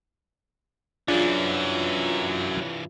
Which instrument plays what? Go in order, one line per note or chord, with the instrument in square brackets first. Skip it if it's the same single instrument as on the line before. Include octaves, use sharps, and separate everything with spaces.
[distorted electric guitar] G2 E3 [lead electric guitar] F#3 C#4 [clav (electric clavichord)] D4 G#4 [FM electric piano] F4